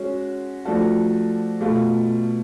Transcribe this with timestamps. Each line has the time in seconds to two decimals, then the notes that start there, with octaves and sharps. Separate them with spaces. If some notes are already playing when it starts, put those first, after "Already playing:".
Already playing: G#3 C#4 F#4
0.65 F3 A3 D4 F#4 A4
1.61 B2 A3 F4